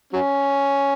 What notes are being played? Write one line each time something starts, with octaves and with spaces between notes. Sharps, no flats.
F#3 C#4